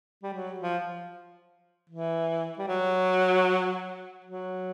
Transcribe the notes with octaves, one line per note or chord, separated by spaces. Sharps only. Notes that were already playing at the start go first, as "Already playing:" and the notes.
G3
F#3
F3
E3
G3
F#3
F#3